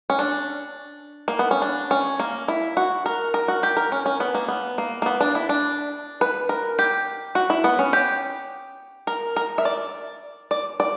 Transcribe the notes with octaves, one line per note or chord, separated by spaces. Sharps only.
C#4
D4
A#3
B3
C#4
D4
C#4
A#3
E4
F#4
A#4
A#4
F#4
G4
A#4
C#4
C#4
B3
A#3
B3
A#3
A#3
B3
D4
E4
D4
B4
A#4
G4
F#4
E4
B3
C#4
G4
A#4
A#4
E5
D5
D5
D5